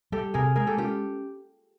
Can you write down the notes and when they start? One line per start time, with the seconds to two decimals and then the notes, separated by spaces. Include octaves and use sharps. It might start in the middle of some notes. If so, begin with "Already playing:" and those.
0.12 G3 G4 A4
0.34 C3 G#4 A#4
0.56 G#3 G#4 A#4
0.67 G4 A4
0.78 C#4 F4 G4